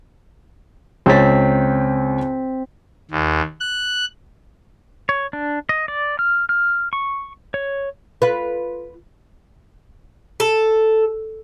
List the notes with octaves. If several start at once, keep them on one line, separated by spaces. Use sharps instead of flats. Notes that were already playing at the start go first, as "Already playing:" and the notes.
C#2 C4 C#5 A6 B6
D#2
F#6
C#5
D4
D#5
D5
F6
F6
C#6
C#5
F4 B4
A4